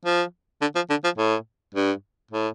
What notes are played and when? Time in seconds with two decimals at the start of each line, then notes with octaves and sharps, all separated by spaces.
0.05 F3
0.61 D3
0.75 F3
0.89 D3
1.04 F3
1.18 A2
1.74 G2
2.31 A2